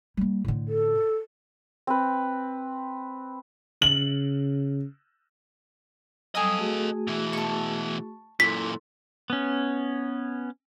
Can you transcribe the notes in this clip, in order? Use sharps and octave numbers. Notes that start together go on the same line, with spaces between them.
G3 A#3
A2 D3
A4
C4 B4
C#3 F#7
F#3 G3 A4 D#5 G#5 D#6 E6
A3 F#4 G#4
B2 E3
A5 C#6
F#2 A#2 E4 A4 C6 B6
B3 C#4